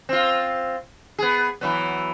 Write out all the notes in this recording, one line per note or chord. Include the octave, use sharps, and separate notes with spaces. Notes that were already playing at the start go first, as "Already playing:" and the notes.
C4 F4
B3 G#4
E3 F#3 B3